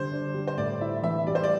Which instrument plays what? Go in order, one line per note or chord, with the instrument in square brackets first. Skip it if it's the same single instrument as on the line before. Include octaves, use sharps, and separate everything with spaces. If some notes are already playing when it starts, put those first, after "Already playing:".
Already playing: [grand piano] D3 G3 [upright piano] C5
[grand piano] D4
G3
[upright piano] C5
[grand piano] A2 [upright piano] D5
[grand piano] E4 [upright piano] E5
[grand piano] E3 [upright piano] E5
[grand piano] G3 [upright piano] D5
[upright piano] C5
D5